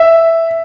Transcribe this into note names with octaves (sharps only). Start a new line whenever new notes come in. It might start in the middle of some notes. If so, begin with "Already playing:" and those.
Already playing: E5